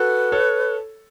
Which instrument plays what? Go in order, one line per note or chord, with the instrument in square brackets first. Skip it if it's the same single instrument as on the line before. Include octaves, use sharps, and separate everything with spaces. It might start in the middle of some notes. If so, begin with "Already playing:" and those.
Already playing: [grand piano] F#4 A4 [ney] B4
[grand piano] A4 C#5